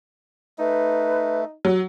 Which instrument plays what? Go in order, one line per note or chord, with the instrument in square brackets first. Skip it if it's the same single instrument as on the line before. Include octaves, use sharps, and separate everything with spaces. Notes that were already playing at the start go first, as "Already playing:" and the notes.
[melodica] A3 [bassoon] D#4 [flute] B4
[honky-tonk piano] F#3